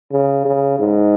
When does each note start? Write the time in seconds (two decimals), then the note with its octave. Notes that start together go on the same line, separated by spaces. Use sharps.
0.12 C#3
0.45 C#3
0.79 G#2